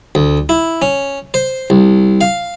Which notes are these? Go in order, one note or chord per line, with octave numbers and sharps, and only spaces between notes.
D2
E4
C#4
C5
C2
F5